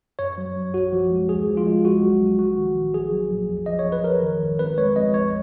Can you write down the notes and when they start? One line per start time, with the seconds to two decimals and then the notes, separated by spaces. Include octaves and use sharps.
0.19 F#2 C#5
0.38 F#3
0.56 F#2
0.74 A#1 F#4
0.93 F3
1.11 G#3
1.29 D#2 G#4
1.48 F3
1.57 F4
1.66 G#3
1.84 A#1 F#4
2.02 F#3
2.21 A#1
2.39 A#1 F#4
2.57 D#3
2.76 A#1
2.94 A#1 G#4
3.12 F#3
3.31 A#1
3.49 F2
3.66 F3 D#5
3.79 C#5
3.85 F2
3.92 B4
4.04 G#1 A#4
4.23 D#3
4.42 G#1
4.59 F2 B4
4.78 G#3 C#5
4.96 F2 D#5
5.14 A#1 C#5